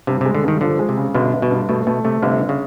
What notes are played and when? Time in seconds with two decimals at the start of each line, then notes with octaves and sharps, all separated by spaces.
0.07 G2 C3
0.21 C3
0.26 G#3
0.35 D3
0.44 G2 D#3
0.61 D3 F3
0.79 G#3
0.89 C3
0.97 C#3
1.15 G1 B2
1.33 G1
1.42 B2
1.51 G2
1.69 B2 A3
1.87 B2 A3
2.04 C3 A3
2.22 G1 C3
2.40 G1
2.49 C#3